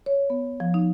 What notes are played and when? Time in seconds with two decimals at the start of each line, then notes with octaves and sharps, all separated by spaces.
0.06 C#5
0.30 B3
0.60 F3
0.74 D#4